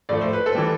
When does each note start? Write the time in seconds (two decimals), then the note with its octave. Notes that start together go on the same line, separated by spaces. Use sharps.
0.09 A2 F3 A3 D5
0.21 C5
0.33 B4
0.46 A4 C5
0.55 E3 G3